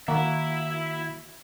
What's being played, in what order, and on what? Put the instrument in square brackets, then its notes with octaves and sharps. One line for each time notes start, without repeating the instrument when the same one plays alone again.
[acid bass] D#3 [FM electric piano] A#3 F#4 [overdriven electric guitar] E4 E5